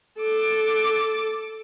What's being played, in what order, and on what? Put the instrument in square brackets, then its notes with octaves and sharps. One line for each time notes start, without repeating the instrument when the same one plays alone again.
[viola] A4 D6